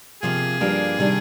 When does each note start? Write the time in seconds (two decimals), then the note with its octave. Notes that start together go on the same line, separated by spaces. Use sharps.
0.22 C3 F3 A#3 G#4
0.60 G2 F3 A#3 D4 G4
0.99 C3 D#3 G3 D4